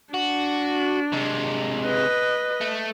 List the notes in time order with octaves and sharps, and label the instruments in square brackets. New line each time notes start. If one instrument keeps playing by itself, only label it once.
[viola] D4 [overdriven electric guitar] F#4
[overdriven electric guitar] C3 G#3
[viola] B4 D#5
[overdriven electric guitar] A3